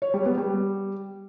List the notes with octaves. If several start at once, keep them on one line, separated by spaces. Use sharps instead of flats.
C#5
G3
B3
G3